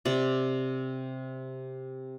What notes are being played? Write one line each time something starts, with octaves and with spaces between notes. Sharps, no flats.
C3 D5